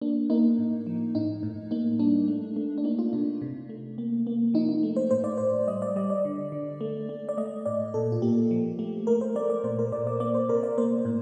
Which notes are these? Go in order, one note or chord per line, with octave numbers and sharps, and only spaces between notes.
A#3 D4
A#3 D#4
A2
F3
A2 D#4
A2
A#3 D#4
G3 D4
A3
A3
D4
A#3 D#4
F4
C3 D4
C3
A3
A#3
A#3
F3 D#4
D#4
A3
C5
A2 C5
D5
A2 C5
G3 D#5
D5
G3 D#5
D5
D3
D3
A3
A3
D5
A3 D#5
A2 D5
A#2 A4
F4
A#3 G4
F3
A3
A3 A#4
C5
A3 D5
D5
A#2 C5
A#4
A#2 D5
D5
A#3 D5
C5
C3 A#4
D5
A#3 C5
A2